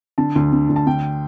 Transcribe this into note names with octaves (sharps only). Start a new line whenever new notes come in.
D3 A5
D2
D3
D2
A5
D3 G5